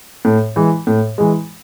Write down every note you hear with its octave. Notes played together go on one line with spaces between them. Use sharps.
A2
E3 G#3
A2
E3 G#3